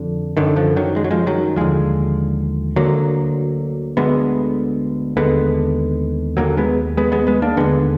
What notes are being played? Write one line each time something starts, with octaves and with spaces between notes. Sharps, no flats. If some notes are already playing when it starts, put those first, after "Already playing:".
Already playing: F2 D3
F#2 D3 D#3
D3 F3
D#3 F#3
G#3
F#3
F3 G#3
D#3 F#3
D#2 D3 F3 G#3
D2 D3 F#3 A#3
D2 D3 G#3 B3
D#2 D3 G#3 B3
D#2 D3 F#3 A#3
G#3 B3
G#3 B3
G#3 B3
G#3 B3
A#3 D4
D#2 D3 G#3 B3